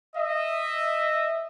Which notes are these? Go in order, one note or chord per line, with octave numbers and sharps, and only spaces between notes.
D#5 E5